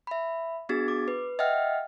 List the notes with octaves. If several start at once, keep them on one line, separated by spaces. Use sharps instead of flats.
E5 B5
B3 D4 F#4 G#4 A6
D6
B4
D#5 E5 F#5 G5 F6